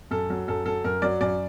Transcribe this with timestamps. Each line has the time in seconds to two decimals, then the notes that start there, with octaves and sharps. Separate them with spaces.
0.11 F#2 A4
0.30 F#3
0.48 F#2 A4
0.66 F#3 A4
0.84 F#2 A#4
1.02 F#3 D5
1.21 F#2 D5